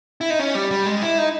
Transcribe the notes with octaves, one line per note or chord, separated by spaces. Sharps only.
E4
D#4
C#4
G3
G3
G#3
E4
D#4